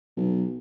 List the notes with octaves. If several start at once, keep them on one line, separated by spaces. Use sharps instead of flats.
B1